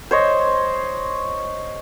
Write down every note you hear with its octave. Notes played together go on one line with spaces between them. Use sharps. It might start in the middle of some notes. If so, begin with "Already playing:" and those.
C5 C#5 D#5